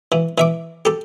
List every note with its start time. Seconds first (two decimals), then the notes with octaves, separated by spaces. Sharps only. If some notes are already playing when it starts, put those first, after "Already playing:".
0.12 E3
0.38 E3 E5 D6
0.85 G4 A4